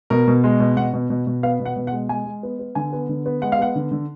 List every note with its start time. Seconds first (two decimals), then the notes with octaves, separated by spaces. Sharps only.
0.10 B2 A#4
0.27 B2
0.44 G#3
0.60 B2
0.77 B2 F#5
0.93 B2
1.10 B2
1.27 B2
1.43 B3 F5
1.60 B2
1.65 F#5
1.76 B2
1.87 F#5
1.92 G#3
2.09 G#3 G#5
2.26 G#3
2.43 B3
2.59 B3
2.75 D3 G#5
2.93 B3
3.09 D3
3.26 B3
3.42 G#3 F#5
3.52 F5
3.59 B3 F#5
3.76 D3
3.91 D3